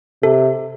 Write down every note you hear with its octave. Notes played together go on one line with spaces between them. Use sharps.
C3 A4